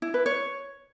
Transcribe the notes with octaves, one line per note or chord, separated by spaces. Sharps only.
E4
B4
C#5